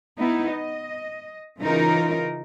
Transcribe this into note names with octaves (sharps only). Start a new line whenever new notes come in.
B3 D#4 E4
D#5
C#3 E3 D#4 F4 A#4